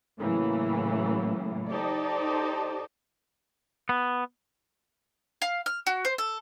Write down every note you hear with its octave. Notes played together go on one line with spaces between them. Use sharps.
A2 C#3 E3 F#3 A#3
D#4 G4 A4 C5 D5
B3
F5
F6
F#4
C5
A4